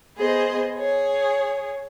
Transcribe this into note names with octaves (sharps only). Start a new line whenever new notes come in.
B3 G#4 C5 D#5
G#4 C#5